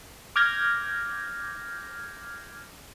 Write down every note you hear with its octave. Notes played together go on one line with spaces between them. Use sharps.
D6 F6 G6 G#6 A#6